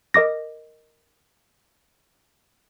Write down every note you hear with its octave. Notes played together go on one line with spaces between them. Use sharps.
A#4 D#5 D6 A#6